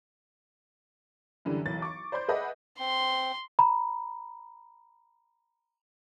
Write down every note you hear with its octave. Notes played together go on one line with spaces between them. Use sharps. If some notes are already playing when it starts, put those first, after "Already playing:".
F#2 D3 E3 G3
B1 E3 A6
C#6 D6
C5 D5 B5 C6 G6
G#4 B4 D#5 E5 F#5
C4 C6
A#5 B5